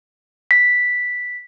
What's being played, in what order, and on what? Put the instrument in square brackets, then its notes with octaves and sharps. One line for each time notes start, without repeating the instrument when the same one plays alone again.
[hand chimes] B6